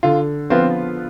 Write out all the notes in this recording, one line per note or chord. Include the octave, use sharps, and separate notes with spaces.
D3 F4
F3 B3 C4 F4 B4